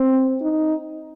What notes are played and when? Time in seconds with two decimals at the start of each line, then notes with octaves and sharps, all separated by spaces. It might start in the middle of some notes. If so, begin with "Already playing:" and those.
Already playing: C4
0.42 D#4